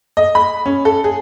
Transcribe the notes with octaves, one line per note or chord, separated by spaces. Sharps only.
D#5
B5
C#4
A4
G#4